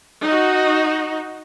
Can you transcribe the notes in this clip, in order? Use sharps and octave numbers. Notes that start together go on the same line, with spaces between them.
D#4 F#4